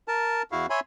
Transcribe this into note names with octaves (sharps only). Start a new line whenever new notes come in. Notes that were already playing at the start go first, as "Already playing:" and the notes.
A#4 A5
E2 E4 F#4 F5
C#5 E5 G#5 B5 C6